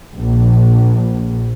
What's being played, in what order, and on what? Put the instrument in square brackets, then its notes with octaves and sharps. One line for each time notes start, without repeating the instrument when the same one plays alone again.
[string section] A#1